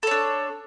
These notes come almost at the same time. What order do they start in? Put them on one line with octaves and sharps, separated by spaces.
A4 C#5 D4